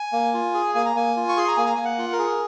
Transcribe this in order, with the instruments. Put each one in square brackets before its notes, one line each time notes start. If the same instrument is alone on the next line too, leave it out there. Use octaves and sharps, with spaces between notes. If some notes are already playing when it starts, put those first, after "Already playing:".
Already playing: [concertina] G#5
A#3
F4
G#4
A#3 G#5
A#5
A#3 G#5
F4
C#6
G#4 C6
A#5
A#3 G#5
A#5
A#3 G#5
F#5
F4
A#4
G#4